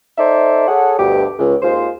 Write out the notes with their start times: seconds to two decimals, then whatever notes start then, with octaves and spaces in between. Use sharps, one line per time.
0.18 D#4 A4 C5 D5 E5
0.68 G#4 A4 C#5 F#5
0.98 D2 G2 B2 G4
1.38 C#2
1.62 D#2 G#3 F4 C5